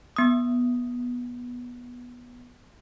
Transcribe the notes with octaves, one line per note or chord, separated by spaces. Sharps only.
B3 D#6